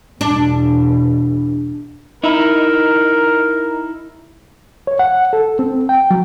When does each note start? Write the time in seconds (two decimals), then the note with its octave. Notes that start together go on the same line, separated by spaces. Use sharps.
0.21 E2 B2 D4
2.24 D#4 E4 A#4
4.87 C#5
4.99 F#5
5.33 A4
5.59 C4
5.89 G5
6.11 F#3